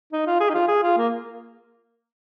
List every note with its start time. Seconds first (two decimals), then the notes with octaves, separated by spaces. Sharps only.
0.12 D#4
0.27 F4
0.40 G#4
0.49 D#4
0.54 F4
0.68 G#4
0.83 F4
0.98 A#3